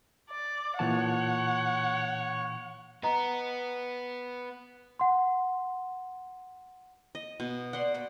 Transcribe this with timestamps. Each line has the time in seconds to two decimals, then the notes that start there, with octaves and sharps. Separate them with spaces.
0.31 D5
0.79 A#2 E3 C#5 F#5 A5
3.03 B3 D#5 A#5 C6
4.99 F#5 C6
7.15 D#5
7.40 B2
7.73 D5 F#5 C6
7.94 A#2 D#3 B4